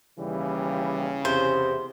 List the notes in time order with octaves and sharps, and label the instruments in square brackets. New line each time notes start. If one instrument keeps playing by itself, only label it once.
[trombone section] D#2 E3 G3 [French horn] C#3
[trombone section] E2 [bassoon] C3 [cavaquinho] C5